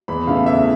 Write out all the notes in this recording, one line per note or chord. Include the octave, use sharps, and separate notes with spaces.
E2 B5
C#3 E3 A3 F5
E2 E5